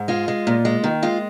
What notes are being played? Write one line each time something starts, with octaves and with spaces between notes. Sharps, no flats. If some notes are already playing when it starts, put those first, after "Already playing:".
Already playing: G#2
G#3 F4
G#3
A#2
G#3
D#3
G#3 F4